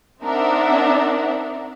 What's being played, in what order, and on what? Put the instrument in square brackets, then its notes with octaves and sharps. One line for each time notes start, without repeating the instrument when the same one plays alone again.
[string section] C4 D4 D#4 A#4 E5 F#5